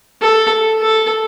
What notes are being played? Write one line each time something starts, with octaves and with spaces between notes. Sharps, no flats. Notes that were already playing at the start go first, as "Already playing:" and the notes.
A4
A4